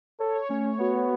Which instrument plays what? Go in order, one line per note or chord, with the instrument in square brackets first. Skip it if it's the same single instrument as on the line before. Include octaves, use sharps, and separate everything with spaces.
[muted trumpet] A4 [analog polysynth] C#5
[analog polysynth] C#5
[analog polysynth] A3 [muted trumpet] C#4
[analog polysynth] C#5
[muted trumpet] B3 [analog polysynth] F#4
[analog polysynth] F#4